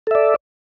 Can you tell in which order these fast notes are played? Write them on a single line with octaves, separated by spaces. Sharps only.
A4 E5 D5